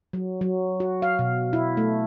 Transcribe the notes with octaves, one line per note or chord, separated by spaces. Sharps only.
F#3
F#3
F#4
F5
B2
E4
A3